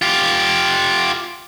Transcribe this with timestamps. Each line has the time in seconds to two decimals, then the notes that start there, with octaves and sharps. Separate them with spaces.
0.02 F4 G4